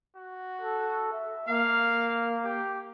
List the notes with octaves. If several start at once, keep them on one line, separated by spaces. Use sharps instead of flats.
F#4
A4
E5
A#3 F5
G4